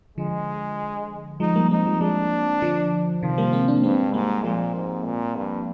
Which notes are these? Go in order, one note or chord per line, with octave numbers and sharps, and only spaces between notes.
D3 F3 G#3
F3 G#3 D#4
G3 A#3
G#3 C4 D#4
F3 G#3
F3 G#3 D4
D3 F3
C3 D#3 F3
G3 A#3
G#3 C4
A#3 D4
G2 G#3 C4
G#2 G3 A#3
A#2 F3 G#3
G#2
A#2
G2